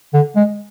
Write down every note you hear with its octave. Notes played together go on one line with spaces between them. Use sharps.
D3
G#3